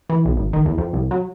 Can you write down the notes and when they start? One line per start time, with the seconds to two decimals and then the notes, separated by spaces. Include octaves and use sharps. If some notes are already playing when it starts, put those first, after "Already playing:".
0.09 E3
0.25 B1
0.37 G#1
0.53 D#3
0.66 E2
0.78 F2
0.93 C2
1.11 F#3